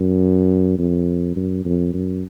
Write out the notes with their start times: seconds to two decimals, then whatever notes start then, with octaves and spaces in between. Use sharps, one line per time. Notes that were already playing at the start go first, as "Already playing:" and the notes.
Already playing: F#2
0.78 F2
1.36 F#2
1.65 F2
1.93 F#2